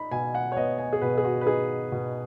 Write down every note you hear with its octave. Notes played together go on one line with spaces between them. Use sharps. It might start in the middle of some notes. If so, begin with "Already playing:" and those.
Already playing: D#4 B5
B2 G#5
F#5
C#5
B3 D#5
G#5
G#4
B2 B4
G#4
F#4
B4
D#4 G#4
B2